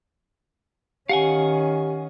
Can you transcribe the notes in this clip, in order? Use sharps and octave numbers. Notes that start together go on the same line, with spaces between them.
D#3 C#4 G4 F5 F#5 G#5